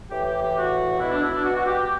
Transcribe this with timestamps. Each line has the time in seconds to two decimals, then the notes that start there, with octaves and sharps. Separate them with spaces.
0.11 A2 E3 G4
0.25 G4
0.40 G4
0.56 F#4
0.99 B2 E4
1.11 D4
1.22 E4
1.33 D4
1.44 F#4
1.55 F#4
1.66 G4
1.77 G4